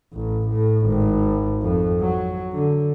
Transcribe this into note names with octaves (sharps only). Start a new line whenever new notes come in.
A1
A2
G#1
F2
F#3
D3